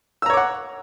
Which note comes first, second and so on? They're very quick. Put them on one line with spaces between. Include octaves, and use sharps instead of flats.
E6 A#5 C#5 D6 F#5